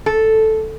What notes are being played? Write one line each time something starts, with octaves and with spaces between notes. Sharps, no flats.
A4